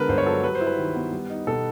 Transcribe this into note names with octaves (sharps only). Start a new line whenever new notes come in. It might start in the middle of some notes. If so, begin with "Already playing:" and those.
Already playing: D3 G#3 B3 A#4 B4
G2 C5
C#5
F#3 A4
G3 B4
C5
E4
B4
D#3
B3
G3
D#4
B2 A4